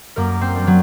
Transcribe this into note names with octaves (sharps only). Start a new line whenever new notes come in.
F#2 A#3 A#4
C4 C5
F#3 A#3 D4
F#3